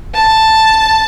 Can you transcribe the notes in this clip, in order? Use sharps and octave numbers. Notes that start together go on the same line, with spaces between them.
A5